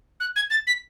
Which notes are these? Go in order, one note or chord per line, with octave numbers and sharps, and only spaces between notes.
F#6
G#6
A6
B6